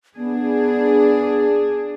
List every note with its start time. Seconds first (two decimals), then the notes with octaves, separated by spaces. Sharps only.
0.16 B3 D4 G#4